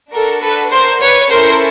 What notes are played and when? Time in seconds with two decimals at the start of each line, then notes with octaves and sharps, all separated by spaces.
0.12 D4 F#4 A4 A#4
0.42 A4 B4
0.71 A#4 C5
1.01 B4 C#5
1.30 C#4 E4 A4 A#4 C5